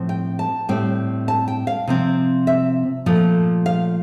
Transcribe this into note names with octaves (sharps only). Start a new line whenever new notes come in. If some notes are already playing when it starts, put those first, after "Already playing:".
Already playing: A2 F3 C4
G5
A5
A2 G3 C4 G5
A5
G5
F5
C3 F3 C4
E5
A#2 F3 A3
F5